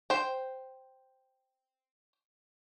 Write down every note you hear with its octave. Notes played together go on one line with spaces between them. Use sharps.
C5 G5